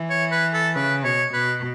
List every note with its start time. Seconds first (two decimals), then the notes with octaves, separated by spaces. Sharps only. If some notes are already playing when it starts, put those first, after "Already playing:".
Already playing: E3
0.10 C#5
0.32 B4
0.54 A4
0.75 C#3 B4
1.05 B2 C#5
1.33 B2 B4